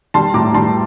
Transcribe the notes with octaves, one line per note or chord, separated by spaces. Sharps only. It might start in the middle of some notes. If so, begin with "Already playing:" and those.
G3 A5 C6
A2 A#5 D6
G3 A5 C6